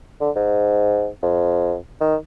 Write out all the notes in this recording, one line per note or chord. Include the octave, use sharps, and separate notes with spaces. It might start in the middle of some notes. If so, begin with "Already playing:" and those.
D3
G#2
F2
D#3